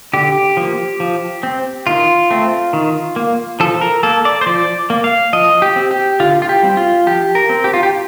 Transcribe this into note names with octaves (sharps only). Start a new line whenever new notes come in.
D3 G4
F3 A#3
F3
C4
D#3 F4
A3 C4
D#3
A#3
F3 A4
A#4
A#3 A4
D5
C5
F3 D5
A#3
F5
F3 D#5
G4
C4
G4
D3 F4
F4
G4
G3 C4
F4
F3 G4
A#4
C4
G4
F4
G4